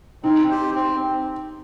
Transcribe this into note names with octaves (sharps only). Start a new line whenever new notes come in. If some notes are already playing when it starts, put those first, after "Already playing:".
C4 D#4
G4 C5
C4